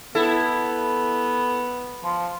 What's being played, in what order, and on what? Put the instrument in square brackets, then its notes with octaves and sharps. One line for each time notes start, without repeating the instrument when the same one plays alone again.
[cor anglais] B3 [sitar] E4 A4
[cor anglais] F3